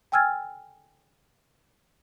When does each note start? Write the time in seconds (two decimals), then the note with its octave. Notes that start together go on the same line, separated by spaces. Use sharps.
0.12 G5 G#5 E6 F6 G#6 A6